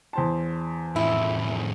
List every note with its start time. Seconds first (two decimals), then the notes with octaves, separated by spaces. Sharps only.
0.13 E2 C5 A5
0.96 F2 A2 E4